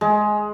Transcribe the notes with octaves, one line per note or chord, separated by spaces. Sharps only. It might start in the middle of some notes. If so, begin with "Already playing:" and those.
G#3